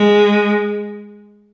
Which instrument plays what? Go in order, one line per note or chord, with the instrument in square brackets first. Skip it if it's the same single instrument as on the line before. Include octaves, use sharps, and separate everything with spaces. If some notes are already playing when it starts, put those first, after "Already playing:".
Already playing: [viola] G#3